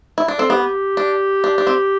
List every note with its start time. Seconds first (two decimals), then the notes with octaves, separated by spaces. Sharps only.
0.18 E4
0.28 D4
0.38 C4 A4
0.50 B3 G4
0.97 D4
1.44 D4
1.58 D4
1.67 C4